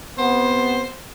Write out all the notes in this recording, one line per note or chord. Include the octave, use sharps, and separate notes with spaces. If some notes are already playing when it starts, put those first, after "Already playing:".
C3 B3 C5